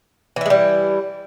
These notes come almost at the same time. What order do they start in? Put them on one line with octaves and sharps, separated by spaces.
E3 E4 G#3 G3